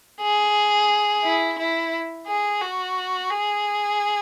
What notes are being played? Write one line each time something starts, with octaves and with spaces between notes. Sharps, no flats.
G#4
E4
E4
G#4
F#4
G#4